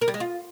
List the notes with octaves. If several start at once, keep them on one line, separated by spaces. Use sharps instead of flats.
A#4
G3
G#3
F4